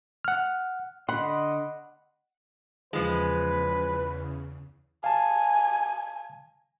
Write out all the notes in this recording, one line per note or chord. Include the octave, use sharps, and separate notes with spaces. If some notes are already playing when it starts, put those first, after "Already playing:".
F#5 F6
D3 D#5 F#5 B5 C6
E2 C#3 F3 G#3 B4
F5 G#5 A5